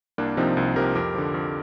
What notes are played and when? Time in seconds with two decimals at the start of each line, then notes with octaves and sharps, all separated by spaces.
0.18 C2 A#3 D4
0.37 C3 F3 C4 D#4
0.57 C2
0.76 C3 F3 G4 A#4
0.95 F2 G4 A#4
1.14 D3 F3
1.34 F2